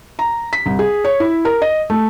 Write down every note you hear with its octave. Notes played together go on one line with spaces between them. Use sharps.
A#5
B6
C2
G#4
C#5
E4
A#4
D#5
A3